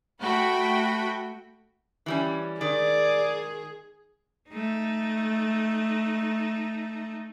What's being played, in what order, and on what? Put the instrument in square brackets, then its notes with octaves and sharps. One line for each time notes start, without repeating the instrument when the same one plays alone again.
[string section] A3 F#4 G5 B5
[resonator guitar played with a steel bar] E3 G3 C#4
[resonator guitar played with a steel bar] D#3 [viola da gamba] G#4 [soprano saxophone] D5
[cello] A3 D#4